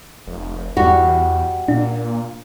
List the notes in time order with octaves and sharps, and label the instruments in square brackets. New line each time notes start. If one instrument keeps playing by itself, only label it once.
[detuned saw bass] F1
[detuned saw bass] E2 [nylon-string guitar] G3 F#4
[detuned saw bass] A#2 [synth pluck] D4